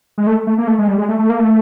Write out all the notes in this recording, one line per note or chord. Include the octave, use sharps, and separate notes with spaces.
G#3
A3
A3
A#3
A3
G#3
G3
G#3
A3
A3
A#3
A3